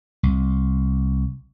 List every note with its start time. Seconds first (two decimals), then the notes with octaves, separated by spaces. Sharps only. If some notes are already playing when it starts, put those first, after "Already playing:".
0.23 C2